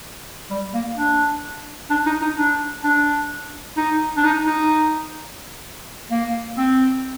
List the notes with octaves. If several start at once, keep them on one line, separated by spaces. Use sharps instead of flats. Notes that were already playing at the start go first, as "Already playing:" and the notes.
G3
A#3
D4
D4
D#4
D#4
D4
D4
D#4
D4
D#4
D#4
A#3
C4